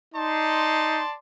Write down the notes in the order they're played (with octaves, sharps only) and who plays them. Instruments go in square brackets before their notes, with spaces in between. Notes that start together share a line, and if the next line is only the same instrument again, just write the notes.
[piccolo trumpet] D#4 [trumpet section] D5 A5 C6